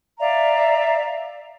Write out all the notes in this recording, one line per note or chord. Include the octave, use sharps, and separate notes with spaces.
D5 E5 F5 A#5